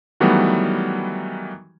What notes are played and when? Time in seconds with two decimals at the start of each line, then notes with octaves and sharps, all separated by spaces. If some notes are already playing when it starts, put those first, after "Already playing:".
0.20 D#3 E3 F#3 G3 A3 B3